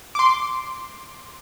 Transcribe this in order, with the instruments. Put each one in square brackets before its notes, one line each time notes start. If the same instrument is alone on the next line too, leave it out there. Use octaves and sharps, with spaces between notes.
[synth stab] C6 D6